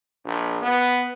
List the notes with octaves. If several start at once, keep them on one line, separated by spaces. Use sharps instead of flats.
A#1
B3